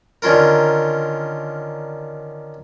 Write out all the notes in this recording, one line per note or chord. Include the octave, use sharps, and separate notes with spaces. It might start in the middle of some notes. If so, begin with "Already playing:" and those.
D3 D#3 C#4 F4 A#4